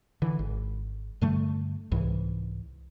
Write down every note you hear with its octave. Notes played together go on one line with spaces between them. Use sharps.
D3 E3
G#1
G2 D3 G3 A3
C2 G#2 E3